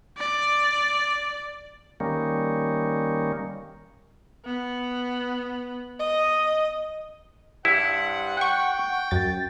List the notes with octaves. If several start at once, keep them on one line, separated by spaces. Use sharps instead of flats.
D5
D#3 G3 A#3 C#4
B3
D#5
G2 E4 C5 F#5
F#5 G5 C#6
F#2 A6